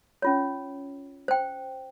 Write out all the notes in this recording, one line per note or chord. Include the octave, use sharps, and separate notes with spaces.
C#4 F4 C#5
C5 G5